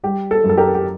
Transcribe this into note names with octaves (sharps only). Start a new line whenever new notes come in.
G3 G4
A4
F#2
A4
G4 A#4
G4